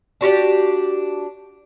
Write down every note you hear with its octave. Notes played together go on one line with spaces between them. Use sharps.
D4 F#4 G4 D5